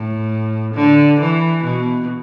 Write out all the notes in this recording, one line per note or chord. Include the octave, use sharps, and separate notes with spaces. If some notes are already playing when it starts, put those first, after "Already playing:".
Already playing: A2
D3
E3
B2